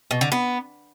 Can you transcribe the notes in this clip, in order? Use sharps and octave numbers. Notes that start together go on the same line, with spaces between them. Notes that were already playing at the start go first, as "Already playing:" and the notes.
B2
D3
B3